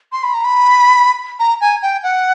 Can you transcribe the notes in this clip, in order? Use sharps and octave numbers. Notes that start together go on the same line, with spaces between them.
C6
B5
A#5
B5
A#5
G#5
G5
F#5